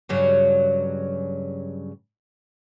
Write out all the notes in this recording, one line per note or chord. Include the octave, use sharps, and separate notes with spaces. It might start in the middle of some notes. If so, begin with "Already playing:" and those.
G2 C#3 F#3